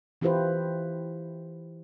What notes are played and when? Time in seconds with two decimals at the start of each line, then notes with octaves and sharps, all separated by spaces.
0.21 E3 E4 F4 G4 B4 C5